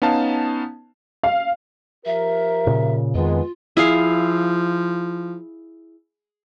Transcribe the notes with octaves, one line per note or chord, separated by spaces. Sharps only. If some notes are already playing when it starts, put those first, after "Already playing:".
B3 C#4 D#4 F5 A5
F5
F3 G4 A#4 E5
A#2 C#3
F2 D#3 G#3 B3 F4
F3 E4 G#4 F5